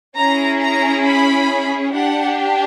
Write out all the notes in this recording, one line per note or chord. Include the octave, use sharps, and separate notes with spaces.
C#4 E4 G#4 A#5
A#5
B5
D4 G4 F#5